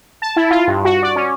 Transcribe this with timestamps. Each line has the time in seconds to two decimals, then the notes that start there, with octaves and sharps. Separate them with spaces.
0.22 A5
0.36 E4
0.51 F4
0.67 G2
0.85 F#4
1.03 D5
1.16 C#4